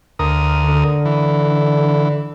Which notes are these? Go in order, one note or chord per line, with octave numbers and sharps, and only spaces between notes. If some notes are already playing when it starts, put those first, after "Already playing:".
D2 A#4 D#6
D3
E3